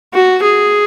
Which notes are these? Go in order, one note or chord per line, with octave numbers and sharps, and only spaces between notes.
F#4
G#4